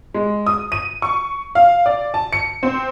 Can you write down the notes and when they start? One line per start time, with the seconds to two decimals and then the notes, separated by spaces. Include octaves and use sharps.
0.14 G#3
0.47 D#6
0.72 D#7
1.02 C#6
1.55 F5
1.86 D5
2.14 A5
2.33 C#7
2.63 C4